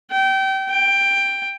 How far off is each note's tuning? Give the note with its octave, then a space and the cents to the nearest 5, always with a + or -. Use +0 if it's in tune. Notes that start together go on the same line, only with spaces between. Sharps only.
G5 -25
G5 +10